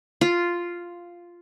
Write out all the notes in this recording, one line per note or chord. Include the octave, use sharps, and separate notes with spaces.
F4